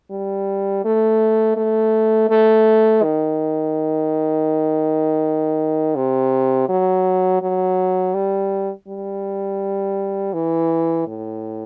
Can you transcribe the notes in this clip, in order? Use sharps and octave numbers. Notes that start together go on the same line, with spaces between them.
G3
A3
A3
A3
D#3
C3
F#3
F#3
G3
G3
E3
A2